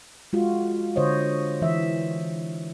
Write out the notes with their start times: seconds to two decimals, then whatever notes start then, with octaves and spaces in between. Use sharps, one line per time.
0.33 G#3 F4 F#4
0.96 D3 C5 C#5 D#5
1.62 E3 E5